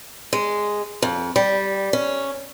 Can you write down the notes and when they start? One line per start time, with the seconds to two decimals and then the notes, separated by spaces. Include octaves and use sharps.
0.33 G#3
1.02 F2
1.36 G3
1.93 C#4